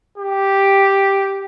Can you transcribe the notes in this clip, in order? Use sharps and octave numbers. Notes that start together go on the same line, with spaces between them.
G4